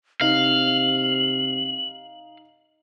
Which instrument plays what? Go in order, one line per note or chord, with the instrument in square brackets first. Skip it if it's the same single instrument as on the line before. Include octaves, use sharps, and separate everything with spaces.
[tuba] C3 [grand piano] D#4 [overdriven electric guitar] F5 [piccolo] F#7